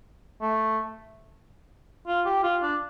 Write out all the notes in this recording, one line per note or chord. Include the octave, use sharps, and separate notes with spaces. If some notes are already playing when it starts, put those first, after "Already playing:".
A3
F4
G4
F4
D4